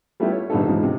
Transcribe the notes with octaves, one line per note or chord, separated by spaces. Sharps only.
G3 A3 B3 E4 F4 G4
C#5
A#1 D3 G3 B3 D#4 A4
E2 G#2 F3
C3